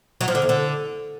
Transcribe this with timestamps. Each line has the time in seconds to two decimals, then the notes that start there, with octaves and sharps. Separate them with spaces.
0.21 F#3
0.28 F3
0.35 D3
0.42 E2
0.49 D3